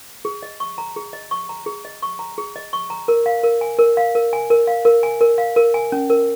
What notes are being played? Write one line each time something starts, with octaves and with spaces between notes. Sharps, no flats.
G#4
D#5
C#6
A#5
G#4
D#5
C#6
A#5
G#4
D#5
C#6
A#5
G#4
D#5
C#6
A#5
A#4
F5
A#4
G#5
A#4
F5
A#4
G#5
A#4
F5
A#4
G#5
A#4
F5
A#4
G#5
C#4
A#4